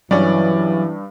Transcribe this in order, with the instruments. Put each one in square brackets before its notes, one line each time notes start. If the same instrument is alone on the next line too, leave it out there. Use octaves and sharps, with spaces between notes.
[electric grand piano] G2 [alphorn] E3 [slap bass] F#3 [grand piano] C#4 D5